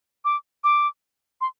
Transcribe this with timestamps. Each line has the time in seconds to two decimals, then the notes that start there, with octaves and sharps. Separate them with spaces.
0.25 D6
0.64 D6
1.41 C6